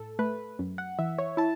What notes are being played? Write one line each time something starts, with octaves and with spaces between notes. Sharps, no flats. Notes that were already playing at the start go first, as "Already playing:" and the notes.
Already playing: A2 A4
A3 B4
F#2
F#5
E3 E5
C#5
E4 A5